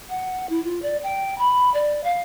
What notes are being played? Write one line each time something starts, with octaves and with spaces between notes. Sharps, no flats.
F#5
E4
F4
D5
G5
B5
D5
F5